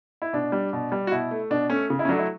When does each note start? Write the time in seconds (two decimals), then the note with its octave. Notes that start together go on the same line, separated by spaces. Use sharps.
0.22 E4
0.33 B2 D4
0.52 G3
0.73 B2
0.92 G3
1.07 F#4
1.11 B2 E4
1.31 A3
1.50 B2 D4
1.70 A3 C#4
1.90 C#3
1.99 E4
2.05 C#4
2.09 F#3 A3 D4
2.18 E4